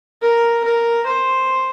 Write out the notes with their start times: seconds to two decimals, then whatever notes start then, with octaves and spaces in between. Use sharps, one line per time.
0.22 A#4
0.64 A#4
1.06 C5